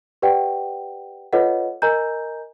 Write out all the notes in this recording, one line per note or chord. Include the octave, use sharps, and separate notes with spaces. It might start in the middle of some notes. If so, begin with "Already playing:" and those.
G4 B4 D5 F#5 G5
F4 A4 B4 C#5 D#5 F#5
A#4 D#5 G#5 A#5 G6